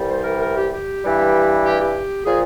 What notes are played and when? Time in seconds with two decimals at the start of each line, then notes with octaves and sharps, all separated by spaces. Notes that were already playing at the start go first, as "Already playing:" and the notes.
Already playing: C2 C3 E3 G3
0.09 C5
0.24 A#4
0.40 A#4
0.55 G4
0.71 G4
1.03 G2 E3 G3
1.63 G4
1.79 G4
2.25 A#2 F3 G#4